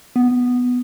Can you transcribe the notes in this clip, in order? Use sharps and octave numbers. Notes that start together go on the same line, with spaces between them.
B3